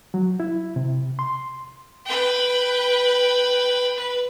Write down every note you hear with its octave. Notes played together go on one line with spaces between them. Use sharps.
F#3
E4
C3
C6
B4 G5
B4